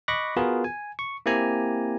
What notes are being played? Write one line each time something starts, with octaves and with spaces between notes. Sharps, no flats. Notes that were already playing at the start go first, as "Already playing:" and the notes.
D#5 B5 C#6 D6 F#6 A#6
B3 F4 F#4 G#4 A#4 B4
G#5
C#6
A#3 C4 E4 G4 G#5 A#5